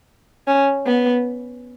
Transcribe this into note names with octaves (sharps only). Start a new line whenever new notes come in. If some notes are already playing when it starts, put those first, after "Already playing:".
C#4
B3